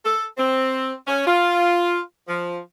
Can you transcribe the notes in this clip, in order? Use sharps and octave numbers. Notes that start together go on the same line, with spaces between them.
A4
C4
C#4
F4
F3